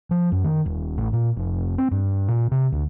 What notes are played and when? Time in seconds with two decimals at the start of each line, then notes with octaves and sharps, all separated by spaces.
0.11 F3
0.32 F#2
0.44 D#3
0.66 D#1
0.98 A1
1.13 A#2
1.37 F1
1.78 C4
1.92 G2
2.28 A#2
2.51 C3
2.72 D2